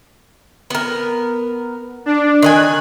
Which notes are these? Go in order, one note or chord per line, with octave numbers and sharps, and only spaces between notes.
B3 A#4
D4
D#3 C5 G#5 F#6